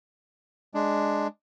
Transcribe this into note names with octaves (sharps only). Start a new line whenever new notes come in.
G#3 D4